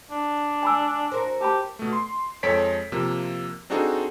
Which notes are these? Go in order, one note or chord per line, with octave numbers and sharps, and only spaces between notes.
D4
G#5 B5 E6
F#4 A#4 C5
G4 A5 B5
B2 A3
C6
F2 G#3 A4 C#5 B6 D7
C3 F3 A#3
C4 D4 D#4 F#4 G#4 A4